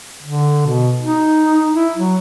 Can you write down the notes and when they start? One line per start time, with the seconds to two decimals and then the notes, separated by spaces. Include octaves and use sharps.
0.23 D3
0.67 B2
1.02 D#4
1.74 E4
1.97 F#3